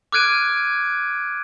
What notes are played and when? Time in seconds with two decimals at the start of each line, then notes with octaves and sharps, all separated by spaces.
0.12 D6 F6 F#6 G#6 D7 D#7